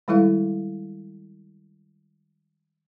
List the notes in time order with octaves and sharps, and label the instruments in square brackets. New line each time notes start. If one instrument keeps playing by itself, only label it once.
[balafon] D#3 G3 G#3 E4 A4 F5